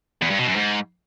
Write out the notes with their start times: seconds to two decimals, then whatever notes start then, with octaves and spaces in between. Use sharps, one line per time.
0.22 E2
0.30 G2
0.39 B2
0.47 F#2
0.56 G#2